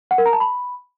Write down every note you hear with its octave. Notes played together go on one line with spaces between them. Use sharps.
F#5
A#4
A#5
A5
B5